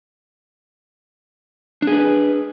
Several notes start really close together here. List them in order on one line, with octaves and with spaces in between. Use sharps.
D4 G#4 B4